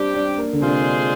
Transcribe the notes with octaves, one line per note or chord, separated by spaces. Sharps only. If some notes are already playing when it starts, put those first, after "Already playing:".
Already playing: G3 C4 D4 G4
D4
A#3
D3
C3 G#3 D4 F4 G#4 C5